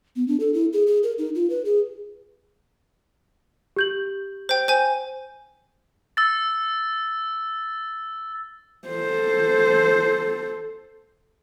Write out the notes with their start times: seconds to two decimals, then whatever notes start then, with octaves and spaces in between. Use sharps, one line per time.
0.16 B3
0.28 D4
0.40 A4
0.54 E4
0.73 G#4
0.87 G#4
1.03 A#4
1.18 D#4
1.35 F4
1.50 B4
1.65 G#4
3.76 G4 G6 F#7
4.49 C5 G5
4.68 C5 G#5
6.17 E6 A6
8.88 A4 C5